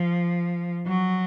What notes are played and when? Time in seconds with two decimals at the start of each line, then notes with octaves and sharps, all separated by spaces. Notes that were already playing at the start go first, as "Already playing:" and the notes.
Already playing: F3
0.87 F#3